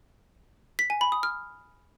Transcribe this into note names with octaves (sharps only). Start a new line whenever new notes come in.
B6
G#5
B5
D#6
F6